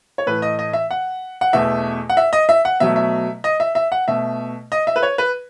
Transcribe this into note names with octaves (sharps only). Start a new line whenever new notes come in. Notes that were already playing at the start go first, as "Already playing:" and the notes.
C#5
A2 E3 A3 B4
D#5
D#5
E5
F#5
F#5
E2 B2 A3 E5
F#5
E5
D#5
E5
F#5
B2 F#3 A3 E5
E5
D#5
E5
E5
F#5
B2 A3 E5
D#5
E5
B4
C#5
B4